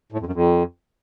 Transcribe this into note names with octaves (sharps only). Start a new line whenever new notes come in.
A2
F2
F#2
F2